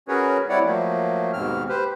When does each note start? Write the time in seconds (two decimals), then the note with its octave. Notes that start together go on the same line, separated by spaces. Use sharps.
0.08 C#4 F#4 G#4 A#4 B4 C#5
0.49 G3 C4 E4 C#5 D5 F#5
0.65 F3 F#3 A3 A#3
1.33 D#2 G#2 B2 C4 F6
1.69 G4 B4 C5